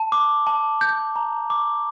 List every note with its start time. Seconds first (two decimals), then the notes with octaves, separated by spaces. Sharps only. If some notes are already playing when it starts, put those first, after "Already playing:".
Already playing: A5
0.12 D6
0.47 A5
0.81 G6
1.16 A#5
1.50 D6